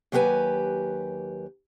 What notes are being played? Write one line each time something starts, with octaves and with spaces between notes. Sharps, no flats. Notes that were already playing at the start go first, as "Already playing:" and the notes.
D#2 F#3 F#4 G4 B4 G#5